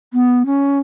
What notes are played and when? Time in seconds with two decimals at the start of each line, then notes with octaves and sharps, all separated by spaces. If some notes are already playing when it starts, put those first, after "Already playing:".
0.13 B3
0.46 C#4